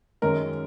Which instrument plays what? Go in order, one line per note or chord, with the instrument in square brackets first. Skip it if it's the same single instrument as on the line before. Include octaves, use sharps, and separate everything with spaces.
[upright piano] F#2 D#3 G#3 C#4 A#4